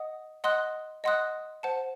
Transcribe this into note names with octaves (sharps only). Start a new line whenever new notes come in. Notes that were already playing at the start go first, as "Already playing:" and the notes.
Already playing: D#5 F#5 D#6
D#5 F#5 C6 D#6 F#6
D#5 F#5 C6 D#6 F#6
C5 F#5 A5